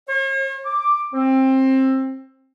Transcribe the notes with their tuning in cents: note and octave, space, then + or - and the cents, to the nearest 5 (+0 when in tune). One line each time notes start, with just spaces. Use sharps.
C#5 -45
D6 +5
C4 +20